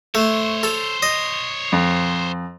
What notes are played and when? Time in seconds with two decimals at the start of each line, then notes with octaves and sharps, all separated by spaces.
0.15 A3 C5 C#5
0.63 A4
1.03 D#5
1.72 F2